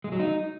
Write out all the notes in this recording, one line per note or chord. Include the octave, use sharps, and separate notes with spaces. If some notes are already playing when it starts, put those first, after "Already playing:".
G#3
F#3
D#4